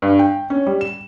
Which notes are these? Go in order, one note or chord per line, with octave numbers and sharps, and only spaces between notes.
G2
G5
C#4
G3
E7